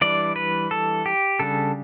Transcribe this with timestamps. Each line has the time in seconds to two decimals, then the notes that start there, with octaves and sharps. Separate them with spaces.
0.01 E3 G3 D4 D5
0.36 B4
0.71 A4
1.06 G4
1.40 C#3 G3 D4 A4